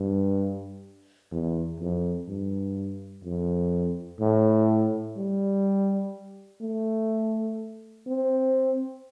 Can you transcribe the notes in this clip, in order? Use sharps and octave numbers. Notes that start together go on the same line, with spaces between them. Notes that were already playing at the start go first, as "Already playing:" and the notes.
Already playing: G2
E2
F2
G2
F2
A2
G3
A3
C4